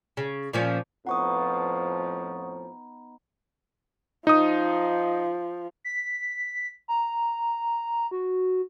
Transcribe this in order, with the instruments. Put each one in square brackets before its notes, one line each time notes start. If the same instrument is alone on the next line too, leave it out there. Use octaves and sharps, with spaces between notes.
[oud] C#3
A#2 F3 C#4
[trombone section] F2 A2 F3 [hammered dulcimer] B3 D#4 [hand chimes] F#5 C#6 D#6
[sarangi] F3 [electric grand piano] D#4 D#6
[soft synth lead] B6
A#5
F#4